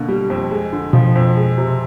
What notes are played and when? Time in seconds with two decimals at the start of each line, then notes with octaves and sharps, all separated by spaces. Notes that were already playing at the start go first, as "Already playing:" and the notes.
Already playing: B2 D3 A#3
0.08 G3
0.30 F2
0.51 G#3
0.73 D3
0.93 B2 F3
1.15 F2
1.36 G#3
1.58 C3